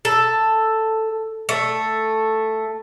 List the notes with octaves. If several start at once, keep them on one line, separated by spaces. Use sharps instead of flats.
A4
A3